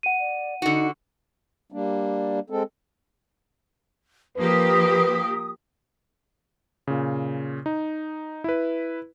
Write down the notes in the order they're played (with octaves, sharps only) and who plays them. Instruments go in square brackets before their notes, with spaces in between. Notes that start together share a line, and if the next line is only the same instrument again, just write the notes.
[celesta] F#5 D#7
[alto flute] D5
[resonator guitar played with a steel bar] D3 F#4 [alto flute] D#4
[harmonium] G3 A#3 D4
G#3 C4 A4
[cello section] F3 A#3 G4 [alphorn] B4 [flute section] D#6
[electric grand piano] A#2 C#3
D#4
E4 B4